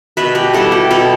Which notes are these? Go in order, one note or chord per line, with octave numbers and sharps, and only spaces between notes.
B2 B4 E5
G4 B4
G3 B3 E4 A4
G4
B2 E4 A4